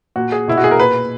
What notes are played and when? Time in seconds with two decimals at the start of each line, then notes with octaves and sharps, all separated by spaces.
0.16 A#2 F#4
0.32 G#4
0.48 B2 E4
0.57 F#4
0.64 G#4
0.71 A#4
0.79 A#2 B4